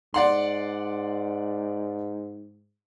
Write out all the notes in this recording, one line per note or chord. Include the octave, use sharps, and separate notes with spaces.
G#2 D5 F#5 C6